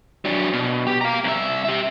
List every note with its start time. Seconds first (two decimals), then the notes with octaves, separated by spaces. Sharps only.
0.25 F#3 D4
0.53 B2
0.87 G4
1.01 F5 A#5
1.24 C2 E5
1.65 G4 E5